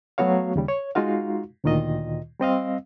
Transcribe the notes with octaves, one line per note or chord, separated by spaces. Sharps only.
F#3 A3 B3 F#4 C#5 F5
D#2 C#3 G3
C#5
G#3 D#4 F4 F#4 F5
D2 A#2 D#3 F4 D#5
G3 C4 D#5 F5